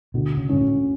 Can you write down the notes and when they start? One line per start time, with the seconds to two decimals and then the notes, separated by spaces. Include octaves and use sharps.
0.14 D2 B2
0.37 C#3
0.49 G#2 C#4
0.60 A2